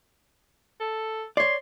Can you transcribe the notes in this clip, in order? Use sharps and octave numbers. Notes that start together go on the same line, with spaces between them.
A4
C#5 D5 C6